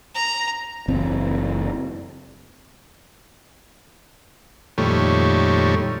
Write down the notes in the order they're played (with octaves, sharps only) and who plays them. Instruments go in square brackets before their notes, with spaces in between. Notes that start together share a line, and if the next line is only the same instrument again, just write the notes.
[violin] A#5
[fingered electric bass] F#1 E3 C4
[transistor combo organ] F2 A#2 D#3 G3 A3 C#5